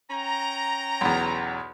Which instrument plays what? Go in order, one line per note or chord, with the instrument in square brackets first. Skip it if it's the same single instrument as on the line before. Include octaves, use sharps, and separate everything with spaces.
[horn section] C#4 G5 A#5
[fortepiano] B1 E2